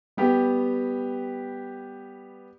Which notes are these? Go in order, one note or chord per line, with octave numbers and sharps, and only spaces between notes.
G3 B3 G4